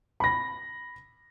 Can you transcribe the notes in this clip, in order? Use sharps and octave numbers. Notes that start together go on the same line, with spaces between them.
B5 A#6